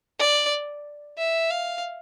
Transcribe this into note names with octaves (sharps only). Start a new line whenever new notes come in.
D5
E5
F5